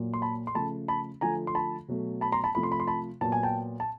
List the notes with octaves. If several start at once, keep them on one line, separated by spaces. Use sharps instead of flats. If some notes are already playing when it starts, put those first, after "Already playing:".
Already playing: A#2 F#3 A#3
C6
A5 B5
C6
C#3 F3 A3 A5 B5
A5 B5
D3 F3 A3 G#5 A#5
C6
A5 B5
B2 F#3 A3
A5 B5
A#5 C6
A5 B5
C3 F3 A3 B5
C6
B5
C6
A5 B5
A#2 F#3 B3 A5
G#5
G5 A5
A5